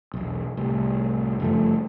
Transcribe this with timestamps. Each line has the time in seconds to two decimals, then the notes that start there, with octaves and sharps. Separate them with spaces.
0.14 E1 B1
0.57 C2 A2
1.40 F#1 G2 F3 A3